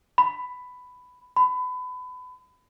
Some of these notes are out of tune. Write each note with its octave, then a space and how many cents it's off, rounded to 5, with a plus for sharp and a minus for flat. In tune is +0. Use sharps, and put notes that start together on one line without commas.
B5 +10
B5 +30